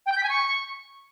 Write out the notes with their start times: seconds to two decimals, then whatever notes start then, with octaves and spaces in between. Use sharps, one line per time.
0.06 G5
0.12 G6
0.18 B6
0.23 G#5
0.29 C#6